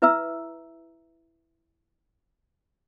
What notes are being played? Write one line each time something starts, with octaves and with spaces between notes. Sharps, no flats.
E4 B4 E5 A#5 E6